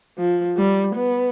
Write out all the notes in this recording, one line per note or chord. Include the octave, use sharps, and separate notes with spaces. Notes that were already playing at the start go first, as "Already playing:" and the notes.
F3
G3
B3